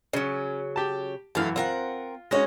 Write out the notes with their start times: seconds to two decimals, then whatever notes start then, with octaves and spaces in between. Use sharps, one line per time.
0.13 C#3 F#3 C#4
0.76 G4 A5
1.35 F#2 E3 A3 F5
1.56 C4 F4 A#4 F#5
2.31 G#3 C#4 D#4 F#4 C#5